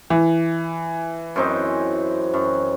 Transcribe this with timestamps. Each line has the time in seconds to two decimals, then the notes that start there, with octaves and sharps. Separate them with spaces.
0.10 E3
1.36 F#2 C4 D#4
2.34 F#2